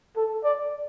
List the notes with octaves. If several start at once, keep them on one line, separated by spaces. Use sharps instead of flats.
A4
D5